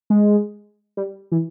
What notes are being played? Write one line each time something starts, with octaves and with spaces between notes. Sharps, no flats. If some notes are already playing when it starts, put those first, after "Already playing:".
G#3
G3
E3